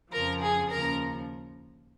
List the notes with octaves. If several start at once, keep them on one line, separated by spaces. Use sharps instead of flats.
F2 C#3 F3 A#4 A#5
G#4 G#5
D#2 C#3 F3 A#4 A#5